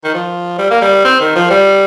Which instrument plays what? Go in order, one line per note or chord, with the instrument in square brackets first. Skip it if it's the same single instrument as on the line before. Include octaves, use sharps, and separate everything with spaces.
[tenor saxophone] D#3
F3
G3
A#3
G3
C4
D#3
F3
G3